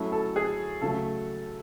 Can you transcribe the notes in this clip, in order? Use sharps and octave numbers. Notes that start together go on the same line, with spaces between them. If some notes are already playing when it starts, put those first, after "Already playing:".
Already playing: F#3 A3 C#4 E4
A4
G#4
C#3 F#3 A3 A4